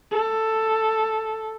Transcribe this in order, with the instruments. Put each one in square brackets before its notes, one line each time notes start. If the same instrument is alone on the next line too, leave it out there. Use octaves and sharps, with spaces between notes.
[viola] A4